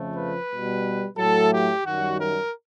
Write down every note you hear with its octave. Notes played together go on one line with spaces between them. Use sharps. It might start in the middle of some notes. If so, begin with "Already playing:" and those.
Already playing: F2 C#3 F3 A3
B4
B2 G3
A2 F#3 A3 A4
G4
F#2 D#3 G3 F#4
A#4